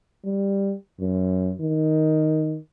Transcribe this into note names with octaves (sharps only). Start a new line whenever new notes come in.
G3
F#2
D#3